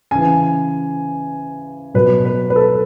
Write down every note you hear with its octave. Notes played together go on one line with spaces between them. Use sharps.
C#3 E3 G#5
B2 F#3 B4
B4
B4
A4